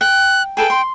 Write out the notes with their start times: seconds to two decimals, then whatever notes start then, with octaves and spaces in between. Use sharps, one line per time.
0.01 G5 F#6
0.57 G#4 A4 B4 G5
0.70 C6